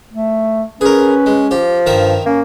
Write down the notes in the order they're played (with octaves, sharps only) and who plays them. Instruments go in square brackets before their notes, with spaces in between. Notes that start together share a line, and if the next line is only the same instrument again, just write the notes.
[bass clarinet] A3
[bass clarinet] C#4 [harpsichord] G#4 A#4 [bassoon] B4
[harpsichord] G#3
[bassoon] F3 [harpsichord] G4
[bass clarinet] G2 [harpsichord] D#3 A#4 E5
[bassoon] A#3 [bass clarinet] C#4